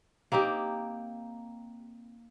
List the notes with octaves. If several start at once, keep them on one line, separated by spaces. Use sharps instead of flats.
A#3 C4 D#4 G4